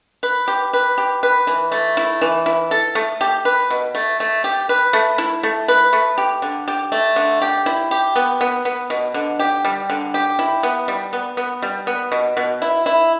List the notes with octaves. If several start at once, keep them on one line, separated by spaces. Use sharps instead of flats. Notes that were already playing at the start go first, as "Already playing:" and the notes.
B4
G4
B4
G4
B4
E3
A3
E4
E3
E4
A4
A3
G4
B4
B2
A3
A3
G4
B4
A3
E4
A3
B4
A3
G4
D3
G4
A3
D3
G4
E4
G4
B3
B3
B3
B2
D3
G4
G3
D3
G4
E4
B3
G3
B3
B3
G3
B3
B2
B2
E4
E4